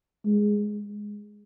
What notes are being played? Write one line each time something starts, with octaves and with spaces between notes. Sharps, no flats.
G#3